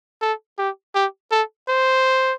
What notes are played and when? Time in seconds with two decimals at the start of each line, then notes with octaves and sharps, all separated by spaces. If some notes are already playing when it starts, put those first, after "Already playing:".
0.22 A4
0.59 G4
0.95 G4
1.31 A4
1.68 C5